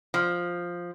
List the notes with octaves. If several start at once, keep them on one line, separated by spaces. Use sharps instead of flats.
F3